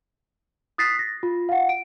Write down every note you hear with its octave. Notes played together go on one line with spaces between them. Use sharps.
D#6 F#6 A6 B6 C7
A#6
F4
F5 F#5
D7